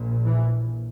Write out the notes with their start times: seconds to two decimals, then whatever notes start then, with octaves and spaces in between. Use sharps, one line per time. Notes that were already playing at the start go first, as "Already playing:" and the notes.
Already playing: A#1 A#2
0.25 E3